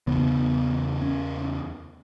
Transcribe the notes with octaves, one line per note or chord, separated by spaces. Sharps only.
E2 C#3 B3
C#4